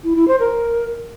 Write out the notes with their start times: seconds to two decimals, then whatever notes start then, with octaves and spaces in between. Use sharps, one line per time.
0.04 E4
0.16 E4
0.28 C5
0.40 A#4